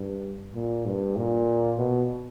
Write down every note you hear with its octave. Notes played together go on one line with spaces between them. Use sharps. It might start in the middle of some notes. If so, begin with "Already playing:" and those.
Already playing: G2
A#2
G2
A#2
B2